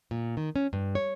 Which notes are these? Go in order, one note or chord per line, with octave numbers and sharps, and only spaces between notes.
A#2
D#3
C#4
G2
C#5